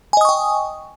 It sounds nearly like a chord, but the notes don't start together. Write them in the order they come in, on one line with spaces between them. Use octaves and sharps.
G#5 D#5 D#6 C#6 G5